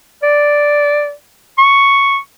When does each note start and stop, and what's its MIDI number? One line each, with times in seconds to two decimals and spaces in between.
0.23 1.13 74
1.58 2.19 85